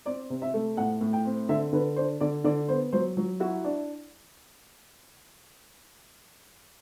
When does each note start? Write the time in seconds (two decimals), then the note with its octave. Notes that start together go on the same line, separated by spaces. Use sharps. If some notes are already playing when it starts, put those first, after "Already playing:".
0.05 C4 D5
0.30 C3
0.42 E5
0.54 A3
0.77 A2 F#5
1.01 A2
1.13 G5
1.25 C4
1.49 D3 E5
1.73 D3 B4
1.96 D4 C5
2.21 D3 D5
2.44 D3 D5
2.68 B3 C5
2.93 F#3 C5
3.17 F#3
3.40 E4 F#4
3.64 D4